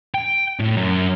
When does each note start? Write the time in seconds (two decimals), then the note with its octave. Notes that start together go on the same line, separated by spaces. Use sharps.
0.14 G5
0.59 A2
0.77 F#2